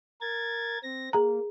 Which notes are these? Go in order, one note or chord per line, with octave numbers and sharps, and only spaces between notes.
A#4 G#6 A6
C4 A#6
A#3 G#4 A#5